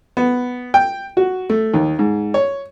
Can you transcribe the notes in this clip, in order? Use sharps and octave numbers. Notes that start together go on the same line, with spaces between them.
B3
G5
F#4
A3
D#2
G#2
C#5